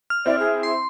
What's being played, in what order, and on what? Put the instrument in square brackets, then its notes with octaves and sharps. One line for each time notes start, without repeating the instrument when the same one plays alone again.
[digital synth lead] F6
[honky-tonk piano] C4 E4 [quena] D5
[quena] G#4
[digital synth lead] C6